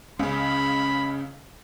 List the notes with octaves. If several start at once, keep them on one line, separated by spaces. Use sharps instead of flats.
C#2 C#3 C#4 B5